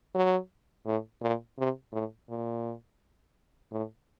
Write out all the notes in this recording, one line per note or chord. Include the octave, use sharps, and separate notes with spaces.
F#3
A2
A#2
C3
A2
A#2
A2